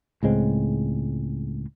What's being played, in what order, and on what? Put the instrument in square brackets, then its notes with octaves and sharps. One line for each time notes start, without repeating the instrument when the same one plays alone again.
[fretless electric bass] C#2 A2 G#3 C4